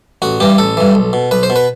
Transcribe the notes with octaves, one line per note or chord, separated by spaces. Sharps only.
A1 F#4
G2 E3 G4
A1 A4
G2 E3
B1
B2
B1 B4
C5
B2
B4